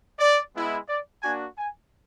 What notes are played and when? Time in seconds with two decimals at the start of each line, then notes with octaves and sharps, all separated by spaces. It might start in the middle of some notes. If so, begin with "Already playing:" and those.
0.19 D5
0.54 G#3 B3 E4
0.88 D5
1.23 A#3 D4 F#4 G#5
1.58 G#5